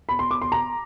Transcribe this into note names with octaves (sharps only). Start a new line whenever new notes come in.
B5
C6
D6
C6
A#5